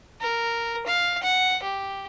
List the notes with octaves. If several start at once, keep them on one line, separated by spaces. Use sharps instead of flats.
A#4
F5
F#5
G4